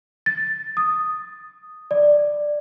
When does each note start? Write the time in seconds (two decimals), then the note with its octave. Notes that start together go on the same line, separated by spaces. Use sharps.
0.26 A6
0.77 D#6
1.91 D5